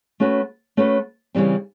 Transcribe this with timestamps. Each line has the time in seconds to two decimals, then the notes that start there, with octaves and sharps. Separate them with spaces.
0.20 A3 C#4 F#4 B4
0.77 A3 C#4 F#4 B4
1.35 C#3 E3 G3 C4